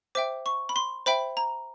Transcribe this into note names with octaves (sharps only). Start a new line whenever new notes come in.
C5 E5 G5 D6
C#6
B5
C6
C5 E5 G5 B5
A#5